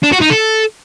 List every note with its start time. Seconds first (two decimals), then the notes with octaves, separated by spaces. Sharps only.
0.03 D4
0.12 F#4
0.21 D#4
0.30 A4